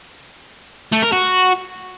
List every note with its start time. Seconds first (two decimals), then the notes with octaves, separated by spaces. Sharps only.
0.92 A3
1.02 A#4
1.12 F#4